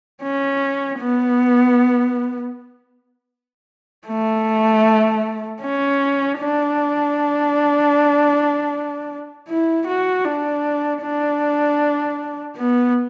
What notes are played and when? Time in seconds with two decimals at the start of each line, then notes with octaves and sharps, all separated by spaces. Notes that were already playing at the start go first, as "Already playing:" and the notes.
0.23 C#4
0.99 B3
4.08 A3
5.63 C#4
6.40 D4
9.48 E4
9.87 F#4
10.25 D4
11.02 D4
12.57 B3